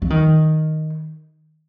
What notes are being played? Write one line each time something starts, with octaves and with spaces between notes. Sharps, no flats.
F3
D#3